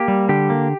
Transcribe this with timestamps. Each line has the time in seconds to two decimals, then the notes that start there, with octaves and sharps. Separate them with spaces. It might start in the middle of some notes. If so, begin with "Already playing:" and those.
Already playing: A#3 G4
0.08 G3
0.29 D3 G4
0.50 A#3